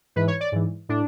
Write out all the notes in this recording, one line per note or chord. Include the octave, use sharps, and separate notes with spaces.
G#2 E3 B4
C#5
D5
G#2 E3
A2 D4